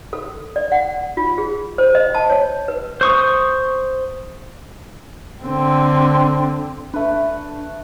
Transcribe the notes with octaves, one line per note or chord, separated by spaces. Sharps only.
A4
D5
F#5
F4
G#4
C5
D#5
A5
C#5
B4
C5 C#6 D#6
D3 C4
A3 D4 B4